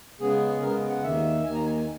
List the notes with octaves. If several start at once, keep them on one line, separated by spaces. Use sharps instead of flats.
C#3 G#3 B3 G#4
C#3 G#3 B3 A#4
F#5
D#2 D#3 A#3 E5
D#2 D#3 A#3 G#5
A#5
G#5
G#5